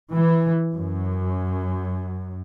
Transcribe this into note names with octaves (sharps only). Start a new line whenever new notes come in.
E3
F#2